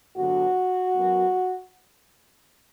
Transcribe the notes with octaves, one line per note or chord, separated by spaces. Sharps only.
G2 D3 F#3 B3 F#4
F#2 F#3 B3